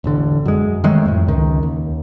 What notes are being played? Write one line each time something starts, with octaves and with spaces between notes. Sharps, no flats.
E1 A1 D3
F#2 G#3
D#3 F#3 G#3 A3
F2 A2
C#2 D#3
D#2